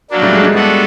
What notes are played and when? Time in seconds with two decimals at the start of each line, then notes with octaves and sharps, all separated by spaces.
0.11 F#3 A#3 D4
0.22 G3 A3
0.33 G#3
0.43 G#3
0.54 G3 B3 D4 F#4 A4